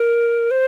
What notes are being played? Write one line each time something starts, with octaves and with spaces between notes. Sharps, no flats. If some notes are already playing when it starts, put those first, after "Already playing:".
Already playing: A#4
C5